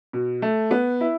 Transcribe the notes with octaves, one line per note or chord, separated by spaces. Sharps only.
B2
A3
B3
E4